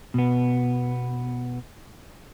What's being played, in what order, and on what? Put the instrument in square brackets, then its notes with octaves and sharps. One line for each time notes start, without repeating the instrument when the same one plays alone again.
[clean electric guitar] B2 B3